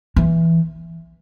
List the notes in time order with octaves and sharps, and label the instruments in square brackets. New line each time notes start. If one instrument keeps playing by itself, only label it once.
[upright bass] E3